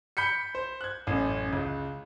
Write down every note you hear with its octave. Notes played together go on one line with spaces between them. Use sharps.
B5 G6 B6 C#7
C5
F#6 G#6
A1 F#2
C#2